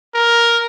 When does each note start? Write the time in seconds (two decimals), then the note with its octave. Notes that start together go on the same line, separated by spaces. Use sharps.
0.14 A#4